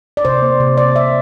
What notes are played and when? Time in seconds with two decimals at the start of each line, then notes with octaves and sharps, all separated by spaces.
0.17 D5
0.25 C3 C5
0.42 A#3
0.60 C3
0.77 C3 D5
0.95 C3 E5